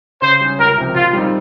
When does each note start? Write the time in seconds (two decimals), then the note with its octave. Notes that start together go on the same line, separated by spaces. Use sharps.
0.22 C#3 C5
0.41 G3 C#4
0.59 C#2 A#4
0.77 C3 F3 C4 G4
0.95 A#2 F4
1.13 G3 C4 D#4